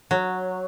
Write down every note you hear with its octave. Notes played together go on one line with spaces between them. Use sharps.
F#3